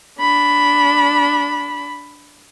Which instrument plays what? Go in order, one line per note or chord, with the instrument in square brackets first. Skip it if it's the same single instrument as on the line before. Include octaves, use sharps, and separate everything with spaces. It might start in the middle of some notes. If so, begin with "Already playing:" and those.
[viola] D4 B5